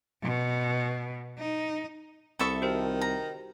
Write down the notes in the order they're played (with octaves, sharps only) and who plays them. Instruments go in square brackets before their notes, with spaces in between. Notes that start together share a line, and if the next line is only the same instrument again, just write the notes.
[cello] B2
D#4
[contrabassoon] C2 [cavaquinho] A4 E5 C#6 [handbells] A5 B5 D#6
[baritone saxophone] D#3 [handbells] F#4 G4 C5
[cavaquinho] A#5